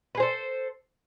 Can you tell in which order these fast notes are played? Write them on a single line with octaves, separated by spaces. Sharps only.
B4 G#4 C5 A4